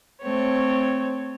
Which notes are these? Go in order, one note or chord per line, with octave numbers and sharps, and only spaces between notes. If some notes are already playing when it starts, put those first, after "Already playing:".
A3 C4 C#5